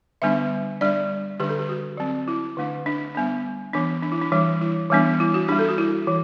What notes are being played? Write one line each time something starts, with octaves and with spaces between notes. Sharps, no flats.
D3 G3 B3 D4 E5
G3 D4 D5
D3 G3 D4 G4
A4
G4
F#4
F#3 C4
E4
D3 A3 D4
D4
G3 B3 D4
E3 B3 D4
D4
E4
D4
E3 G3 D4
E4
E3 G3 B3 D4
E4
F#4
G3 D4 G4
A4
F#4
E4
E3